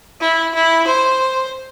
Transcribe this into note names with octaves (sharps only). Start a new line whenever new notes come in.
E4
E4
C5